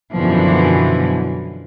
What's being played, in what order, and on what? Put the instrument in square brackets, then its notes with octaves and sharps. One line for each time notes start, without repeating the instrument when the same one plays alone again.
[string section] F#2 B2 D3 E3 F3